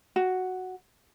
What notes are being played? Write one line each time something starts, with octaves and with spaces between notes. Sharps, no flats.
F#4